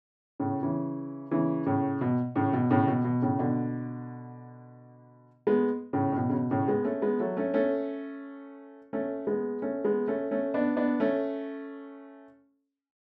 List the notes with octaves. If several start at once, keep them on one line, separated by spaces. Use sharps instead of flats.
A2 C#3
C#3 E3
C#3 E3
A2 C#3
B2
A2 C#3
B2
A2 C#3
B2
B2
A2 C#3
B2 D3
G#3 B3
A2 C#3
A2
B2
C#3
B2
A2 C#3
G#3 B3
A3 C#4
G#3 B3
F#3 A3
A3 C#4
A3 C#4
A3 C#4
G#3 B3
A3 C#4
G#3 B3
A3 C#4
A3 C#4
B3 D4
B3 D4
A3 C#4